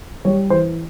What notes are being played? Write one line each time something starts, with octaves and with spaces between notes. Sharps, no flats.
G3 C#5
E3 C5